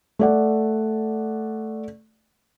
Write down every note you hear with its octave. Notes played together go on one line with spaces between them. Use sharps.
A3 D5 F#5